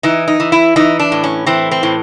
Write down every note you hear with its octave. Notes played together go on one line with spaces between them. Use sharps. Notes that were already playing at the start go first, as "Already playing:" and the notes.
E3 D#4
D#4
E3
E4
E3 D#4
D4
A2
C#4
E3 C4
C4
A2